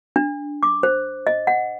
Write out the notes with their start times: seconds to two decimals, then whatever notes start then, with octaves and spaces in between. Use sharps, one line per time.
0.16 D4
0.63 D6
0.83 C5
1.27 D#5
1.47 F#5